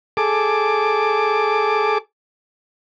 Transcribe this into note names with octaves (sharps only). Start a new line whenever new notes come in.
G#4 A4 D6